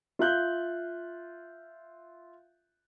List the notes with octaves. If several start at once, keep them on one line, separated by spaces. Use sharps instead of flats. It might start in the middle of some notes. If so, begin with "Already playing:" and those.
F4 E5 F#6 G6